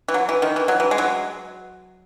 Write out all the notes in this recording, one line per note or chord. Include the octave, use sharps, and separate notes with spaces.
E3
F#3
E3
D#3
E3
F#3
E3
G#3
F#3